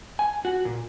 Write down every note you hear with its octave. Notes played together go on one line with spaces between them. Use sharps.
G#5
F#4
A#2